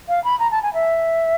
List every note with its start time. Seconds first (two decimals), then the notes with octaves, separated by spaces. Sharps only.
0.09 F5
0.24 B5
0.39 A#5
0.51 A5
0.63 G#5
0.74 E5